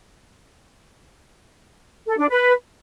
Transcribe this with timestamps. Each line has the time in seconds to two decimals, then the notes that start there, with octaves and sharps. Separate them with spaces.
2.08 A4
2.19 D4
2.30 B4